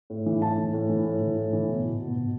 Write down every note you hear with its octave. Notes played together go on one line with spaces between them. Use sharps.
A2
E3
A2 A5
E3
A2
E3
A2
E3
A2
E3
B2
B2
B2
B2